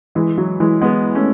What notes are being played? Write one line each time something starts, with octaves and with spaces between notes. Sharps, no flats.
E3 G#3
F#3
E3 G#3
G#3 B3
A3 C#4